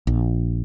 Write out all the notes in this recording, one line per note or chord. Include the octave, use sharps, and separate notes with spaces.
A#1